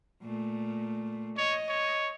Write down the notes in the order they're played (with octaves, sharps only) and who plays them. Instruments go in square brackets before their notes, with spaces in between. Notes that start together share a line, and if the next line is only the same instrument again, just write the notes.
[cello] A#2 A3
[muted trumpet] C#5 [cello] D#5
[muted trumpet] C#5